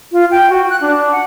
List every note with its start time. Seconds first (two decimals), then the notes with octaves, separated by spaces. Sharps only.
0.12 F4
0.31 G5
0.50 F#4
0.70 F#6
0.81 D4
1.12 F#5